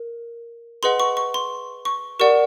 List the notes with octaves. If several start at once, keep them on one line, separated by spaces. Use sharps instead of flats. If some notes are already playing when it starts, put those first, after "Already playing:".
Already playing: A#4
G#4 B4 D#5 F#5 C6
C#6
C#6
C6
C#6
G4 A#4 D5 F#5 C#6